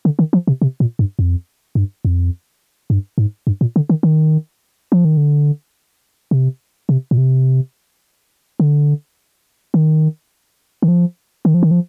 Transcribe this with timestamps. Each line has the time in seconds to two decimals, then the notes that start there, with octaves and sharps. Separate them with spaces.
0.05 D3
0.19 D#3
0.33 F3
0.47 C3
0.62 C3
0.80 A#2
0.99 G2
1.19 F2
1.75 G2
2.05 F2
2.90 G2
3.18 G#2
3.47 G2
3.61 A#2
3.76 D3
3.89 D#3
4.03 D#3
4.92 F3
5.05 D#3
5.17 D3
6.31 C3
6.89 C3
7.11 A#2
7.18 C3
8.60 D3
9.74 D#3
10.82 D#3
10.88 F3
11.45 D#3
11.54 F3
11.63 D#3
11.71 F3